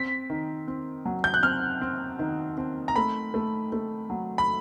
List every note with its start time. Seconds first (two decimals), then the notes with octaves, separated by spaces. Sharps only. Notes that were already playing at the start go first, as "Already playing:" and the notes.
Already playing: C4 B6
0.30 D#3
0.68 C4
1.05 F#3
1.24 G6
1.34 F#6
1.43 C4 F6
1.81 C4
2.19 D#3
2.58 C4
2.88 A#5
2.96 A3 B5
3.34 A3
3.72 A3
4.10 F#3
4.38 B5